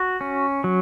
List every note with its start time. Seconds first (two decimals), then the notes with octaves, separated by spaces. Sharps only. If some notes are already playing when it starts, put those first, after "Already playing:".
Already playing: F#4
0.21 C#4
0.64 F#3